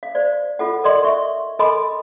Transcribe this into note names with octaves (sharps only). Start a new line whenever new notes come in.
F5
C5 D5
F4 A4 F#5
A4 A#4 D5 D#5 F#5 C6
E5 C#6
A4 A#4 D#5 G#5 B5 C6